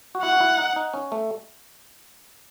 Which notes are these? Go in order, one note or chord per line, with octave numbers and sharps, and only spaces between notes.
F#4
E4 F#5
F#4
E4
D#4
D#4
C#4
A3